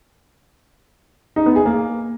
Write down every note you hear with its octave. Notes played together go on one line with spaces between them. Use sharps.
D#4
B3
G#4
A#3